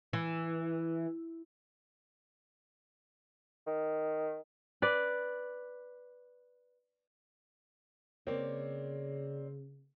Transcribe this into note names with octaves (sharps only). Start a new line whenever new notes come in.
E3
D#3
B4 D5
C#3 A#3 C4 C#5 D5